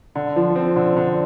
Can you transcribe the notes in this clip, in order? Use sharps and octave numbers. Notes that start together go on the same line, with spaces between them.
D3
F3
C4
D3
D3